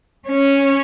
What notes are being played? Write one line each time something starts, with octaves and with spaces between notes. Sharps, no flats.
C#4